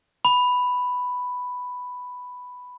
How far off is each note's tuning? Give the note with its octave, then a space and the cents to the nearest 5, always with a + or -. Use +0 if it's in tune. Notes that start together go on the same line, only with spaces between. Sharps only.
B5 +5